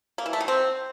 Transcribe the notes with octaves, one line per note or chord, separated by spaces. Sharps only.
A#3
E3
A3
D#3
C4